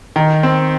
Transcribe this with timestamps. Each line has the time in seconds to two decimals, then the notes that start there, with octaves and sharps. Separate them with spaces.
0.16 D#3
0.43 C4